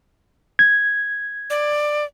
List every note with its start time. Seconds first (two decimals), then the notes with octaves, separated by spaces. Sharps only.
0.59 G#6
1.50 D5